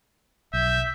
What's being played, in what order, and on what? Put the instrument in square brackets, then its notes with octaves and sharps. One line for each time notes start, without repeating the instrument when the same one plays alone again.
[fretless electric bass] B1 [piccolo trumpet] E5 [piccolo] G6